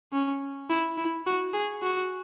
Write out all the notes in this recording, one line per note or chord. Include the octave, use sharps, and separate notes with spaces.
C#4
E4
E4
F#4
G#4
F#4